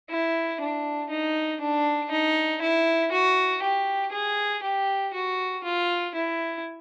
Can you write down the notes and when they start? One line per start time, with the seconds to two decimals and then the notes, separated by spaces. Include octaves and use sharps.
0.10 E4
0.60 D4
1.10 D#4
1.61 D4
2.11 D#4
2.61 E4
3.12 F#4
3.62 G4
4.12 G#4
4.63 G4
5.13 F#4
5.64 F4
6.14 E4